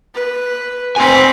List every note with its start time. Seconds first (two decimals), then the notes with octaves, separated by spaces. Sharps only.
0.15 B4
0.96 C4 C5 G#5 B5